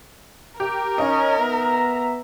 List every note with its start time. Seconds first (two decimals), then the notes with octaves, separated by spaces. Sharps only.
0.60 G4 A#4
0.98 C#4 D#4 D#5
1.38 B3 E5 A#5